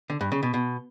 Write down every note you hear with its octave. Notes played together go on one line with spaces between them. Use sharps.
D3
G2
C#3
B2
B2